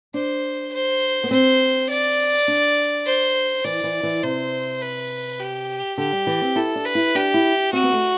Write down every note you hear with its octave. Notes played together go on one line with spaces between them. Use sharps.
D4 C5
C5
B3
C4 C5
D5
D4
C5
E3 D5
E3
E3
C3 C5
B4
G4
D3 G4
G3
E3
C4
E4 A4
D4
B4
E4
D4 G4
E4
C4 F#4
B3
A3